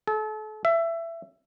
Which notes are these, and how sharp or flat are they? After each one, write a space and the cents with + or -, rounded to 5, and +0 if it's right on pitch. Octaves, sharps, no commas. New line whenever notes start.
A4 -35
E5 +20